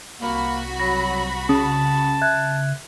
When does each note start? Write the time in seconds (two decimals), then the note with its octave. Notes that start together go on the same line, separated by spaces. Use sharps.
0.21 C2 A#3 F#4 B5
0.80 F#3 A#6
1.49 C#3 A5 D#6
2.21 E5 F#6 G#6